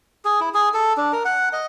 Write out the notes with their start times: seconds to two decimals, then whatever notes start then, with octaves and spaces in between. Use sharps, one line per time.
0.25 G#4
0.40 E4
0.54 G#4
0.74 A4
0.97 D4
1.12 A#4
1.25 F#5
1.53 D#5